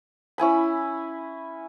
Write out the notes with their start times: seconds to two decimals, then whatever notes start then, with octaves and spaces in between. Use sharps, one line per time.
0.38 C#4 E4 G#5 B5